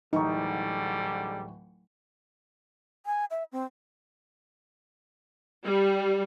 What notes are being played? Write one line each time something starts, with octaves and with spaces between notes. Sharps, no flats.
D1 G#2 D3 E3 G3 D#4 C#6
G#5
E5
C4
G3